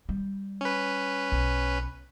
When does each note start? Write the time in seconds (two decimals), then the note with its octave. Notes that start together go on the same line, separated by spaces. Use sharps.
0.09 G3
0.61 C#4 B4
1.32 B1